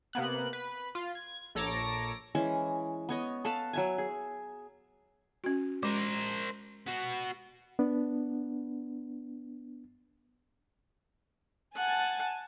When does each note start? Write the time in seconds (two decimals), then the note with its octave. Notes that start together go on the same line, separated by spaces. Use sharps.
0.13 C3 A#3 B3 F#6
0.53 B4
0.95 F4
1.15 G#6
1.55 A#1 A4 C#5 A#5 D6 A#6
2.35 E3 G#3 C#4 C5
3.09 B3 C#5 D#5
3.44 A4 B4 F5 A5
3.73 F#3 E5 G#5
3.98 G#4
5.44 C#4 F#4
5.83 G#3 A#4 C5
6.87 B3 F#4
7.79 B3 D4
11.75 F#5 G#5 A5